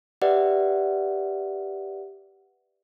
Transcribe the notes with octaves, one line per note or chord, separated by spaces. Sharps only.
G4 B4 D5 E5 F#5